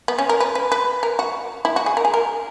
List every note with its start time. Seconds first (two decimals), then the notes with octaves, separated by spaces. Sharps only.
0.08 B3
0.18 C#4
0.29 A#4
0.40 B4
0.55 B4
0.72 B4
1.03 A#4
1.19 F#4
1.65 E4
1.76 F#4
1.86 G#4
1.97 A#4
2.05 G#4
2.14 A#4